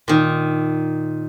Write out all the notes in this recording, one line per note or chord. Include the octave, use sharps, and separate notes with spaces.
A#2 D#3